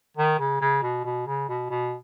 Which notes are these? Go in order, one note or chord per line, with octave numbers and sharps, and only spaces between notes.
D#3
C#3
C#3
B2
B2
C#3
B2
B2